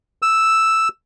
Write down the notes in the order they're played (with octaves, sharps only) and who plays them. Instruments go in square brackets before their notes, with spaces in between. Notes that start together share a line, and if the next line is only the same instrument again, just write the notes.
[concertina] E6